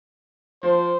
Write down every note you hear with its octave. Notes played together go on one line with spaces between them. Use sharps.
F3 C5